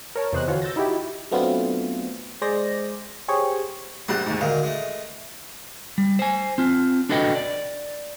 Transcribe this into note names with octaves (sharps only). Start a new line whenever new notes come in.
A#4 C#5 A5
E2 C3 C5 D#5 F#6
D3 E3 F4 F#4 C5 C#5
E6 G6 A6 A#6
D#4 E4 F#4 G4
F#3 A3 B3 C4 D4 F4
G#3 G#4 C5 D5 A#6
G4 G#4 C5 C#5
A#1 G3 C5 F#5 F#6
D#2 G#2
D2 A#2 D#3 F5
G#3 A3
G3
C5 G#5
C4 F4
D4 F#4 A4 B4 D#5 G5
D5